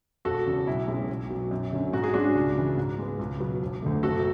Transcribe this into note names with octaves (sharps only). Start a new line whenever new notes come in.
E1 F#4 A4
E2 C#3
B1 E4
B2 G#3 C#4
B1
B2 F#3
F#2
D3 F#3 C#4
G#2 F#4
G#4
G#3 C#4 D4 F#4
C#2
C#3 E3
G#2
G#3 B3
C#2
B2 F#3 B3
E1
D2 D3 A3
F#1 F#4 A4